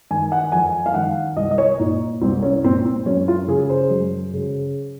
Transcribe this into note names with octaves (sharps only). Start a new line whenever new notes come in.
D#3 G#5
F#5
F2 G#5
F5
D#3 F#5
C2 D#5
D#5
C#5
A#2 D#4
C2 C4
C#4
A#2 C4
C4
F#2 C#4
F4
C#3 G#4
C5
F#2
C#3